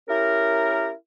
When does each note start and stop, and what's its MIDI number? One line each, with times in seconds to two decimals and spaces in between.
0.09 0.91 61
0.09 0.91 64
0.09 0.91 67
0.09 0.91 70